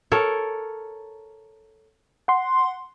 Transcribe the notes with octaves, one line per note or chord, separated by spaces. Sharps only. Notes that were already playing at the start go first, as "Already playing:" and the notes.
A4 A#4 C#5
F#5 C6